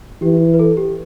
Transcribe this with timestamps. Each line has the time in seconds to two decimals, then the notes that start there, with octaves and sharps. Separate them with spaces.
0.22 E3 G4
0.54 B4
0.59 A4
0.77 G4